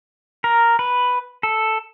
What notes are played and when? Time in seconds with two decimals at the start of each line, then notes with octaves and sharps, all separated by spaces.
0.44 A#4
0.79 B4
1.43 A4